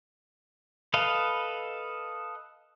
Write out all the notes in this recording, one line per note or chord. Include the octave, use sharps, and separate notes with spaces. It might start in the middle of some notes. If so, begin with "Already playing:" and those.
A4 B4 D#5 F5